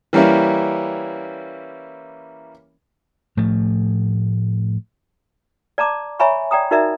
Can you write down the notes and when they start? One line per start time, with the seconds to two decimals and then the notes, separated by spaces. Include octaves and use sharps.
0.13 E3 G3 A#3 C#4 E4
3.37 A2 F3 A3
5.78 D5 A5 A#5 D6
6.19 C#5 E5 G#5 A#5 B5 C#6
6.51 D5 G5 A#5 D#6
6.71 D#4 F#4 A#4 D5 E5 A#5